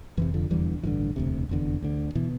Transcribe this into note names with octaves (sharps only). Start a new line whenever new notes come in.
F1 F2 C3 E3
D3 F3
F1 E2 D3 E3 G3
A1 G2 D3 E3
E1 D2 C3
F1 E2 D3
D2 D3
B2 E3